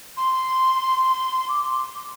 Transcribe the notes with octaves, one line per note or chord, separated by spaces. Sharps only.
C6
D6
C6